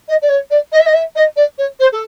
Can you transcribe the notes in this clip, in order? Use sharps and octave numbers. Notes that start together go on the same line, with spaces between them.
D#5
D5
C#5
D5
D#5
E5
D#5
E5
D#5
D5
C#5
C5
A4